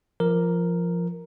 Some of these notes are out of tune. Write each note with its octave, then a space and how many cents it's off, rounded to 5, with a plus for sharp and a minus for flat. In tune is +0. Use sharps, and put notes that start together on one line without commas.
F3 -15 A#4 +0